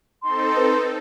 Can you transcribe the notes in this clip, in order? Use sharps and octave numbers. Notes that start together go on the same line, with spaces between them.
C4 D#4 A4 C6
B4